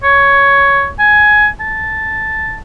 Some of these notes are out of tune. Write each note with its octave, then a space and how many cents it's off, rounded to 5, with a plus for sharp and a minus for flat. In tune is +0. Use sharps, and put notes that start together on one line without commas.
C#5 +10
G#5 +15
A5 -5